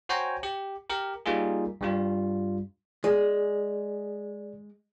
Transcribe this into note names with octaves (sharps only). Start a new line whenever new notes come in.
F#4 C5 C#5 G5 G#5 A#5
G4
G4 A#4
G3 A#3 D#4 F4 G#4
G2 G3 F4
G#3 G#4 D5